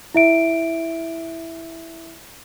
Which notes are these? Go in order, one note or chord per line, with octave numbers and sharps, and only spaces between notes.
E4 E5 D7